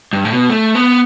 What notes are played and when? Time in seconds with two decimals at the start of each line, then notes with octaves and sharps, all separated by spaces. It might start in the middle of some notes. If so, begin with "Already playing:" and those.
0.13 G2
0.25 A2
0.31 B2
0.50 A3
0.75 B3